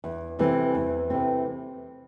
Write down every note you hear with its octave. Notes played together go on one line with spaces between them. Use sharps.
E2
C3 E3 A3 C4
E2
C3 E3 A3 C4